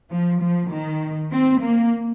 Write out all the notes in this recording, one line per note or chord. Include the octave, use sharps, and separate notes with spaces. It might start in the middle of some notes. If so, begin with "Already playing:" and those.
F3
F3
D#3
C4
A#3